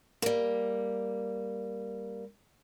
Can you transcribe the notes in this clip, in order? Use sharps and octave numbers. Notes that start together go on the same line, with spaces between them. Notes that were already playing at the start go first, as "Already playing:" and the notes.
G3 A#3